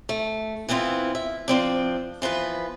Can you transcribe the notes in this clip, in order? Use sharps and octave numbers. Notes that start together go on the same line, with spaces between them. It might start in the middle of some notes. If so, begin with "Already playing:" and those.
A3
E3 B3 C4 E4 F4
E5
F3 C4 D4
E3 F3 B3 B4